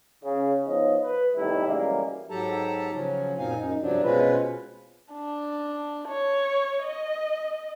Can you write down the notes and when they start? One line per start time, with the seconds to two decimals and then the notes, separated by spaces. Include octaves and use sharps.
0.24 C#3
0.67 F3 B3 D#4 C#5 D#5
1.02 B4
1.37 B1 A2 C3 D#3 G3 E4
1.68 F#2 C#3 E3 G3 G#3 A#3
2.30 G#2 F#3 G4 A4 A5 A#5
2.94 C#3 F3 F#3 C#4
3.39 F#2 A#2 C4 D#4 F5 G#5
3.57 F#2 D#4
3.81 G2 C3 F3 F#3 D4
4.03 B2 G#3 C4 C#4 F4 B4
5.12 D4
6.08 C#5
6.83 D#5